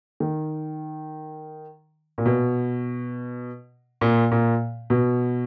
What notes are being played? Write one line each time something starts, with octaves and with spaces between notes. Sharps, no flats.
D#3
A#2
B2
A#2
A#2
B2